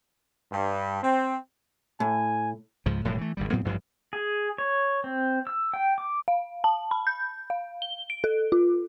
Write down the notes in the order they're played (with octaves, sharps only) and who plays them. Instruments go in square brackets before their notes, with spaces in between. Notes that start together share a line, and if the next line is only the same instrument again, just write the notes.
[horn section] G2
C4
[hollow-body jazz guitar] A2 [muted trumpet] G#5
[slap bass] C#2 G#2 F3
E1 A2 F3 G3
E3 A3
G#1 D2 G3
A2 F#3 B3 C4
A1 G2 F3 G3
[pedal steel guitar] G#4
C#5
C4
E6
G5
D6
[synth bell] F5
A5
B5
G6
F5
G7
D7
A4
F4